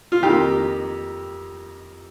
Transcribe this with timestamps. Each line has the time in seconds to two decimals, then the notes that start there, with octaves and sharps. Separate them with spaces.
0.12 F4
0.23 F2 D#3 A#3 G4